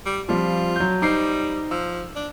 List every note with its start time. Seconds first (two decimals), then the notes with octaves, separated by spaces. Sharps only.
0.06 G3
0.29 F3 G3 C4 F4
0.76 F#3 G6
1.02 G3 D#4 C5 C7
1.71 F3 E6
2.16 D4